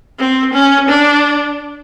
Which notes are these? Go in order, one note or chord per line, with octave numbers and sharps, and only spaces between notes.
C4
C#4
D4